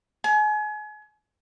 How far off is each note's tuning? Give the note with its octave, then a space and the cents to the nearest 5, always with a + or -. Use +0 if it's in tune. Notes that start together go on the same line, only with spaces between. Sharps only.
G#5 +35